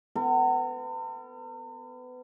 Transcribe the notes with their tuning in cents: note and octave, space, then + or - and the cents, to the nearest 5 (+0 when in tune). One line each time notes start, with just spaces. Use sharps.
B3 +30 A#4 -45